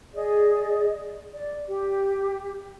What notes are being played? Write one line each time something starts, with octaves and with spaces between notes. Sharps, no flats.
G#4 D5 D#5
D5
G4